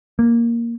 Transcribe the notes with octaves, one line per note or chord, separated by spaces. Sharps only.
A#3